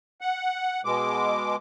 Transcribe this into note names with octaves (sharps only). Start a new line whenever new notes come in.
F#5
B2 G#3 D6